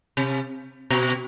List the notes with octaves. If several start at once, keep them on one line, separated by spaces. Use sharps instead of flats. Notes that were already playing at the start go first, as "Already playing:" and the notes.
C3
B2